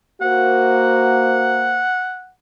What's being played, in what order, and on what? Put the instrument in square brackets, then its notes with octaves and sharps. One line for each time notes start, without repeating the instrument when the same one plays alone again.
[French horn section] A#3 C5 [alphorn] F#4 [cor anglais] F#5